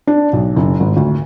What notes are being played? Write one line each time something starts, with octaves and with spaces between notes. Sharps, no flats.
D4
B1
F#1
G#1
D2